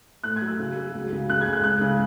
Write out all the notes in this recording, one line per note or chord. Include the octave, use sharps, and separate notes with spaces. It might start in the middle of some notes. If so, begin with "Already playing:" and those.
A2 F#6
G#6
F#3
E6
C#3
F#3
C#2
C#3
C#3 F#6
G#6
G#3
F#6
C#2 F#6
C#3